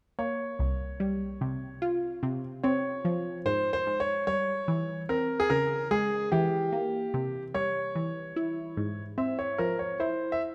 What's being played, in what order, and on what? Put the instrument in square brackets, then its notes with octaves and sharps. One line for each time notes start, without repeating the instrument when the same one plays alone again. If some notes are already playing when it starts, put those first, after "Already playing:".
[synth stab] A#3 [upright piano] C#5
[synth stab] C2
G3
C3
F4
C3
[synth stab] C4 [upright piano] C#5
[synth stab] F3
[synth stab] G#2 [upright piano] C5
[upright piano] C5
[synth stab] G#2
[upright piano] C#5
[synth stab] G3 [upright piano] C#5
[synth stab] E3
[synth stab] C4 [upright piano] A#4
[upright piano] G#4
[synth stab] C#3 [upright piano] A#4
[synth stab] G#3 [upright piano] G#4
[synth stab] E3 [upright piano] G4
[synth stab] A#3
C3
[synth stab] G3 [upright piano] C#5
[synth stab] E3
E4
G#2
[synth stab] C4 [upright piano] E5
[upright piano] C#5
[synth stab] F3 [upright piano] A#4
[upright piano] C#5
[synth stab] E4 [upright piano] C5
[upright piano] E5